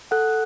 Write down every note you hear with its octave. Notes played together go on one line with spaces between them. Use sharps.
A4 F#5 F#6